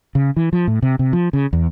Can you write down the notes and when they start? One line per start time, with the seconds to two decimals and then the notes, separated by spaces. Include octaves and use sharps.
0.15 C#3
0.37 E3
0.53 F3
0.67 A2
0.82 C3
0.99 C3
1.13 F3
1.33 C#3
1.53 E2